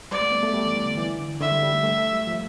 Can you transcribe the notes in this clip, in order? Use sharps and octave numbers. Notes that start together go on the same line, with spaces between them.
G3 D5
A3
B3
A3
G3
E3
D3
E3
D3
D3 E5
G3
G3
A3
A3
G3
F3